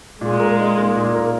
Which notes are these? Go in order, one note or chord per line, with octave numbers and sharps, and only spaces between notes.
A#2 G#3
A#4
D#4
A#3
A#2
A#4